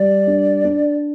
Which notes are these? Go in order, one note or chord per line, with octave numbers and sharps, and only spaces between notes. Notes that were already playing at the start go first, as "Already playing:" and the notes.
Already playing: G3 D5
D4
D4